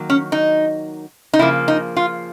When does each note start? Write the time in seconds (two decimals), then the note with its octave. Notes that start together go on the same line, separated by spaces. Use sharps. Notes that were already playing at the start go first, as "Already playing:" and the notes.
Already playing: D#3 F#3 A#3
0.10 C#4
0.32 D#4
1.33 D#4
1.39 C#3 F3 A#3 E4
1.68 D#4
1.97 F4